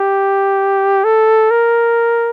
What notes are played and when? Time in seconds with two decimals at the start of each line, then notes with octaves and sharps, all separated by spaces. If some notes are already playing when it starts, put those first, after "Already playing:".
Already playing: G4
1.04 A4
1.51 A#4